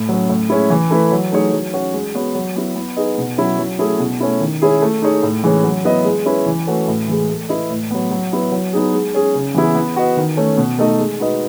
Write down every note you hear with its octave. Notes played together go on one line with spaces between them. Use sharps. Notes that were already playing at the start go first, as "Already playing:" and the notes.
Already playing: A2
F#3 C#4
A2
G#3 C#4 E4
E3
A3 E4 B4
F#3
A3 D#4 G#4 C#5
F#3
C#4 F#4
G#3
B3 F#4 C#5
F#3
B3 E4
B3
D#4 G#4 B4 D#5
B2
F#3 C#4 E4
F#3
A3 C#4 E4 G#4
B2
A3 C#4 E4
D#3
G#3 C#4 E4 G#4
A3
D#4 G#4 C#5
A2
E3 G#3 C#4
F#3
B3 E4 B4 D#5
G#3
C#4 E4 B4
E3
A3 C#4 F#4 B4
A2
E3 G#3
A3
E4 B4 D#5
A2
F#3 B3
F#3
B3 E4 B4
F#3
B3 D#4 G#4
G#3
C#4 G#4
C#3
E3 B3 E4 G#4
B3
F#4 B4 D#5
D#3
A3 C#4
B2
A3 D#4 A4 D#5
G#3
D#4 F#4 B4 D#5